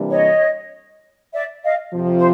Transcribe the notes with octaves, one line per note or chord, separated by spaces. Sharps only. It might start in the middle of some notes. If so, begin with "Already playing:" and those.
Already playing: C3 E3 G3 A#3 D4
C#5 D#5
D5 E5
D#5 F5
F2 C3 F3
C5